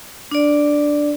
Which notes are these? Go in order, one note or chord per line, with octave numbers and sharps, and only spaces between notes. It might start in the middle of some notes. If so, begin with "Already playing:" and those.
D4 D5